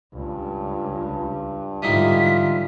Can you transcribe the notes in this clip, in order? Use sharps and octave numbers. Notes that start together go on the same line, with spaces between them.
C#2 G2
G#2 D3 E3 G3 D#4 F4 B6